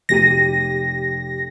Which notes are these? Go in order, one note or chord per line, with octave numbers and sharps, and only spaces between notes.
F1 G4 A#6 D#7